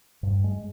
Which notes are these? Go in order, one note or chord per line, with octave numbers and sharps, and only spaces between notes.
G2
G#3